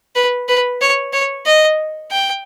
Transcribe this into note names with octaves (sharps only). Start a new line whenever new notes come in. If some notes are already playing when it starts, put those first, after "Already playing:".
B4
B4
C#5
C#5
D#5
G5